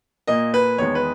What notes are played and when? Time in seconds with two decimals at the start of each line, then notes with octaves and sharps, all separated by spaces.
0.27 A#2 A#3 D#5
0.54 B4
0.78 E2 D#3 G#3 B3 C#5
0.95 B4